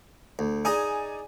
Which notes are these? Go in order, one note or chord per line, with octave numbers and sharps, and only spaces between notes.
D2
D#4 G#4 D5 D#5 G#5